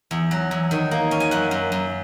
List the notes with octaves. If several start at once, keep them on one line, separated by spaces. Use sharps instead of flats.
E2
F#3
E2
D#3
A#3
C#4
G#5
F#2 F#5
F#2
F#2